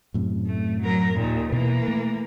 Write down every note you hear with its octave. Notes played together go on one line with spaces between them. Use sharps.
F#2 A2 C3
A3
F#3 A#4
D#2 A#2
B2 E3 A#3
A3